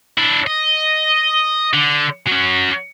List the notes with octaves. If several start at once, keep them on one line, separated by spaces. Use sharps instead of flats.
D4 E4
D#5
D3
F#3 C#4